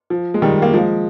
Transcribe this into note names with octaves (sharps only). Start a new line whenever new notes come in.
F3
G#3
D#3 G3
A#3
F3 G#3